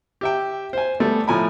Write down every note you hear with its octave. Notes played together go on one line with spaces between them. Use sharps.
G4 E5 G5
C5 G#5
G3 A3 B3
A2 F3 G#5 A#5 B5